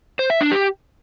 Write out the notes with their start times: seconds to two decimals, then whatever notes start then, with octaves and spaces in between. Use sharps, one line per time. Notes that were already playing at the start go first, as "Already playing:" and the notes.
0.19 C5
0.30 E5
0.41 D4
0.52 G4